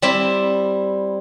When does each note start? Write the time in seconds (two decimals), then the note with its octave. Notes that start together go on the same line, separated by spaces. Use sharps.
0.02 G3 C4 E4 E5